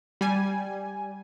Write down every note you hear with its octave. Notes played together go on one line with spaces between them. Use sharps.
G3 G#5